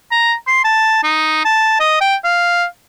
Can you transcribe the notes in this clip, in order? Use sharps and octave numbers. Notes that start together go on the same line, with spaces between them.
A#5
C6
A5
D#4
A5
D#5
G5
F5